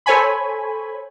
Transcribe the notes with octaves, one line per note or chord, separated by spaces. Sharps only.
A4 C5 C#5 G#5 B5